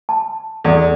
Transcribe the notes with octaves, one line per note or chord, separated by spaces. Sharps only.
A5
E2 A4 D5